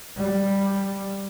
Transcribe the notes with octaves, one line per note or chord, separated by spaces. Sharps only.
G3